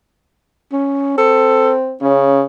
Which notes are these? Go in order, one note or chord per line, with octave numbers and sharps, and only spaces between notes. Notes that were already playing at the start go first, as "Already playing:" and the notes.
C#4
C4 A4
C#3 C#4